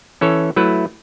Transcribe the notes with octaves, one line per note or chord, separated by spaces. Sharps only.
E3 C#4 A4 C#5
F#3 A3 E4 B4